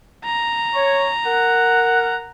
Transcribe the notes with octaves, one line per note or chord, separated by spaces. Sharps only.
A#5
C#5
A#4 F#5